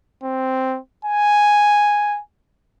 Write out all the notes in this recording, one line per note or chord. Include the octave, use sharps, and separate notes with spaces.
C4
G#5